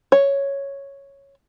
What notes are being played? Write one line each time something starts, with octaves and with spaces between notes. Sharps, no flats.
C#5